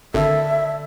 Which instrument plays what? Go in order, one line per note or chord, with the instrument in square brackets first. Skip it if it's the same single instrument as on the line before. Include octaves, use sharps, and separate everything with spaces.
[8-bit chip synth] G#1 [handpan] D3 A4 [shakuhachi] E5